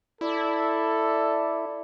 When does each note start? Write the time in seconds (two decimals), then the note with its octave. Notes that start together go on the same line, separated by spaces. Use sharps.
0.21 E4 A4 D5